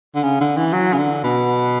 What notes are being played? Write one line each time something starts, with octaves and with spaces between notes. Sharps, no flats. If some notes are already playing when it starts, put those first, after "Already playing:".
D3
C#3
D3
E3
F#3
C#3
D3
B2